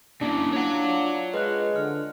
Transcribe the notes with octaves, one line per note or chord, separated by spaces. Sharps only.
C#3 A#3 D4 E4 F#4
F4 C#5 F#5
G#3 B4 D#5 F#6
D3 F6